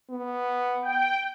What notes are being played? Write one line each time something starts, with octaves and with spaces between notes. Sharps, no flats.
B3
G5